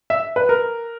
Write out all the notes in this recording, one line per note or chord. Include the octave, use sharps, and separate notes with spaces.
E5
B4
A#4